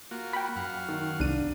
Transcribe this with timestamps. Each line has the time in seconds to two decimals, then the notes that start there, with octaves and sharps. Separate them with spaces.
0.11 A#3 F4 F#4
0.33 G5 B5
0.56 F#2 F5 F#5
0.88 D#3
1.20 C2 D4 D#7